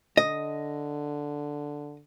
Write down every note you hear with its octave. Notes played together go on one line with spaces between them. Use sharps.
D3 D#5